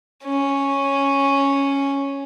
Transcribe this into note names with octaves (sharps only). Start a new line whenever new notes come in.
C#4